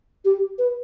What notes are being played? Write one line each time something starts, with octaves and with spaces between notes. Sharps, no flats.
G4
B4